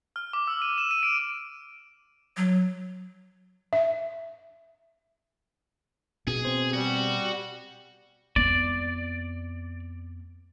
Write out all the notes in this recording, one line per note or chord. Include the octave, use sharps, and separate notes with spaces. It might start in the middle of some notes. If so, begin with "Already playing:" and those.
F6
D6
E6
D#7
E7
D#7
D7
F#3
E5
B2 G#4
C4 C5
G3 F#4
F2 B3 D5